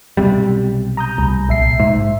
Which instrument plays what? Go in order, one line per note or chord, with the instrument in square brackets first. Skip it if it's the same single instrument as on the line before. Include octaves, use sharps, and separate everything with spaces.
[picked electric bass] B1 C3 G3
[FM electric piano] A#5 D#6 G6
C2
A#1 E5 C7
[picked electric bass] G#2 [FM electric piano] E5